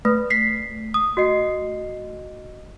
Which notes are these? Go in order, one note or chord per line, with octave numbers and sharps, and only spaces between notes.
A3 B4
B6 C7
D#6
F#4 D#5 C7